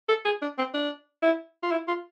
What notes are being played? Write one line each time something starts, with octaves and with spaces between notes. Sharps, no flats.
A4
G#4
D4
C4
D4
E4
F4
E4
F4